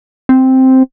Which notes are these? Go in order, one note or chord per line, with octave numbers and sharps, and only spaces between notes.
C4